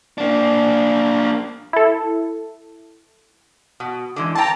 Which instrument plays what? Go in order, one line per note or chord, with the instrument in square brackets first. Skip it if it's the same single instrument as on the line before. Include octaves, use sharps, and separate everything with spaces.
[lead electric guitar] A#3 D4
[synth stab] E4 A4
[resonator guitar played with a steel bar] B2
D3 E3 G#3
[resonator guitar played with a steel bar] C4 G5 [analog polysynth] A5 A#5